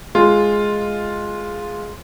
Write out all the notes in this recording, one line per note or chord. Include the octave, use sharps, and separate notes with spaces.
G#3 F4